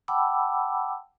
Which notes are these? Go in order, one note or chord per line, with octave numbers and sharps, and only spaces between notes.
F#5 G5 A5 B5 D6 E6